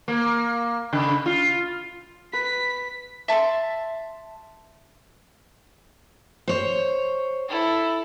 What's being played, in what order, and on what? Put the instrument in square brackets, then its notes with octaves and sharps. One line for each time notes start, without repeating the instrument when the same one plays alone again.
[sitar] A#3
C#3
F4
[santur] B4 [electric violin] B6
[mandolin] E5 A5 B5 C6
[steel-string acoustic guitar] C5 C#5
[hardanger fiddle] E4 A4